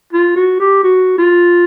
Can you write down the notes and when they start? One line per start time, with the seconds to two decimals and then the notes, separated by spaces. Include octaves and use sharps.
0.13 F4
0.36 F#4
0.60 G4
0.84 F#4
1.18 F4